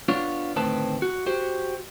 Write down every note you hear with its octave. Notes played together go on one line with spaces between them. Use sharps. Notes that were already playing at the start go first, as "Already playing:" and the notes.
B3 D4 F4 C#5
D2 A2 D#3 C4 B4 A5
F#4
F#4 G4 C5